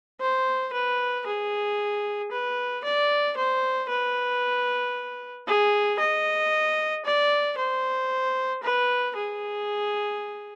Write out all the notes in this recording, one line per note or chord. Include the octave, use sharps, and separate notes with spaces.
C5
B4
G#4
B4
D5
C5
B4
G#4
D#5
D5
C5
B4
G#4